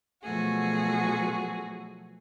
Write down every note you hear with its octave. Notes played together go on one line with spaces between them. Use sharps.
B2 F3 F#3 A3 F#4 G#4